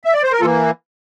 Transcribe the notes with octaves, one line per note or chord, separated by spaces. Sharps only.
E5
D5
C5
A#4
E3 A#3 F4 A4